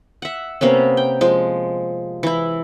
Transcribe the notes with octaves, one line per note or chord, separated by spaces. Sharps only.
E5 F#5
C3 A#3 B3 C#4
G5
F3 G#3
E3 E4